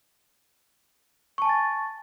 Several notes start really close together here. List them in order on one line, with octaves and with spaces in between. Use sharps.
C#6 A5 G#5 A6